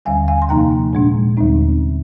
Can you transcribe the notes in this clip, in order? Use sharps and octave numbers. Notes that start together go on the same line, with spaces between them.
D#2 D3 G3 F5 G#5
F5 G#5
C6
F2 C3 F3 A#3 D#4 G5 A#5
A#2 G#3 D4
D#2 D3 G3 C4 D#4